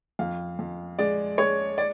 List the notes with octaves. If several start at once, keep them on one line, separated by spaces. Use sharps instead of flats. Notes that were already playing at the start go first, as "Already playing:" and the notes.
F2 F5
F2
G#3 D5
G#3 C#5
D5